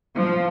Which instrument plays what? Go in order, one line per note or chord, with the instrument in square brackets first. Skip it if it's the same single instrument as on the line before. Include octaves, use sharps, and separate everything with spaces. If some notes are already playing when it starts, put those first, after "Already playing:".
[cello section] F3